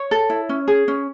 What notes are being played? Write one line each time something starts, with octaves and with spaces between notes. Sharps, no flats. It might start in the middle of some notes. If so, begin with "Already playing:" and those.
Already playing: C#5
A4
E4
C#4
G#4
C#4